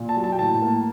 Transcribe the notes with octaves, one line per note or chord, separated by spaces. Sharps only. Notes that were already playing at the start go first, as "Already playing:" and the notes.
Already playing: A#2
A5
F#3
A5
G5
A2 A5
A#3